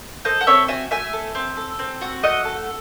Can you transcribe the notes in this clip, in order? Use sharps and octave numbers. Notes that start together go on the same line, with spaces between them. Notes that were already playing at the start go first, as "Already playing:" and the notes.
A4 C5 D#5
F#5
C4 C#5 E5
F#4 E5 G#5
A3 E5 G#5
A4
C4
A4
C4
F#4
A3 D#5 F#5
A4